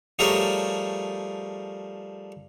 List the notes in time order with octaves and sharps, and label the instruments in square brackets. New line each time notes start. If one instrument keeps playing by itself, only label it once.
[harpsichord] F3 G3 A3 G#4 A#4 C#5